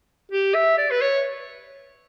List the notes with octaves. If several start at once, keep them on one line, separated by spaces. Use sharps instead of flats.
G4
E5
D5
B4
C#5